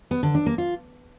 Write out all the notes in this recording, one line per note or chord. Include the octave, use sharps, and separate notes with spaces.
B3
D3
D4
A#3
F4